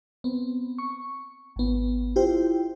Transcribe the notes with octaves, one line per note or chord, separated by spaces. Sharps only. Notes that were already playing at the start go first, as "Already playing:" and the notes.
B3 C4
C#6
G#1 B3
E4 F4 G4 C5 G5